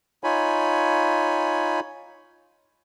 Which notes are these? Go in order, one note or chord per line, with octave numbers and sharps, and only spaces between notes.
D#4 F4 C#5 G#5 B5